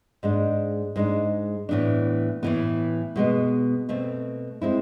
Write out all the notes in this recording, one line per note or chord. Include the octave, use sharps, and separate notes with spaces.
G#2 G#3 D4
G#2 G#3 D4
A2 E3 B3 D4
A2 E3 B3
B2 G#3 B3
B2 A3 C4
G#3 C4 E4